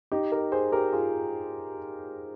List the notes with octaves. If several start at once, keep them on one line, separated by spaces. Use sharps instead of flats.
D#4 G4
G4 A#4
G#4 C5
G4 A#4
F4 G#4